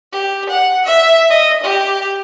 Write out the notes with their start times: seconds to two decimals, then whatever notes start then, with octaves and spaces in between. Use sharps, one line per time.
0.12 G4
0.49 F#5
0.85 E5
1.30 D#5
1.63 G4